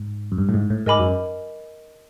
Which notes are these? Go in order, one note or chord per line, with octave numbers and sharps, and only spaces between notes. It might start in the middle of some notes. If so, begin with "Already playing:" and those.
Already playing: G#2
F#2
G2
A2
G#2
A2
G#2 A#4 D#5 G#5 B5 D6
F#2